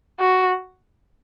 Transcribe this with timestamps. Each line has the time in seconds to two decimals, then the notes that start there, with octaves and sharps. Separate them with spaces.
0.20 F#4